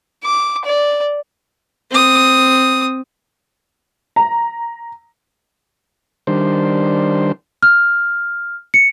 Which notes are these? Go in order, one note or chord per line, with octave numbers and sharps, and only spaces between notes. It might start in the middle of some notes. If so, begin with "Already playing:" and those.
D6
D5
C4 D#6
A#5
D#3 G3 D4 C5
F6
C#7